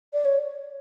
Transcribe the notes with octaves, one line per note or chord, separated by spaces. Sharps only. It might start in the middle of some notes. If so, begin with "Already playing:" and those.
D5
C#5